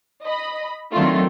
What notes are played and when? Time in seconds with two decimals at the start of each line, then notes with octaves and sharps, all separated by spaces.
0.23 D#5 B5
0.93 D#3 F#3 A3 C4 D4 F4